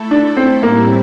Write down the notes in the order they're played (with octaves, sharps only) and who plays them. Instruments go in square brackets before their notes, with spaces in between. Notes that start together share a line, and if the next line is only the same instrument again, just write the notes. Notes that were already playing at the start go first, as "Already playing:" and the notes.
Already playing: [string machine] A3 E4 A4
[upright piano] D4
C4
[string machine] A2 G3 C4 E4 [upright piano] A#3